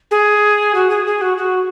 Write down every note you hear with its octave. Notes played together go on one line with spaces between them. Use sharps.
G#4
F#4
G#4
G#4
F#4
F#4